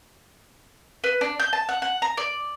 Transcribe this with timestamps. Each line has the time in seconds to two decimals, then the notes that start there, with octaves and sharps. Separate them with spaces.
1.04 B4
1.21 D4
1.40 G6
1.53 A5
1.69 F#5
1.82 F#5
2.02 A#5
2.17 D5